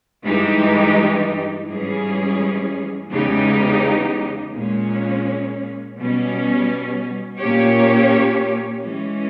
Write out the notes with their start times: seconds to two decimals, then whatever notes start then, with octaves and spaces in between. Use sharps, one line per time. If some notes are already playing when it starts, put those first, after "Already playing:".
0.25 G2 E3 G#3 D#4 G4
1.67 G#2 E3 G3 C#4 G#4
3.11 E2 C#3 G#3 D#4 G4
4.54 A#2 G#3 C#4
5.97 B2 G3 C#4
7.39 A#2 A#3 C#4 G4 C#5
8.83 E3 G#3 C#4